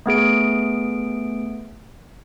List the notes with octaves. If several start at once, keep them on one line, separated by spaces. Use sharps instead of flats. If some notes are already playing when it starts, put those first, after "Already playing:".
A3 B3 G#4 D7